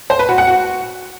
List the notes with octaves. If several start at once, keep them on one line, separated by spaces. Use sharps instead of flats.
C5
B4
F#4
F#5
F#4